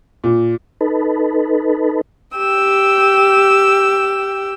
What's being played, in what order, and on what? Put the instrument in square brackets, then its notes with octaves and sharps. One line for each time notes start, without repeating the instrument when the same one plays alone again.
[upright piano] A#2
[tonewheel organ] D#4 A4 B4
[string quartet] G4 G5 E6